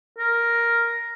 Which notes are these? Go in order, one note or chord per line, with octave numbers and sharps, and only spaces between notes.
A#4